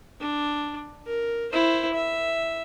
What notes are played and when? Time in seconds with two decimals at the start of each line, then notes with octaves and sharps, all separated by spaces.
0.20 D4
1.06 A#4
1.52 E4 C5
1.93 E5